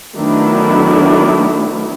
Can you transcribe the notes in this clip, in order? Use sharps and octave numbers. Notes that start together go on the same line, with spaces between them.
D#3 F#3 A3 B3 D4 E4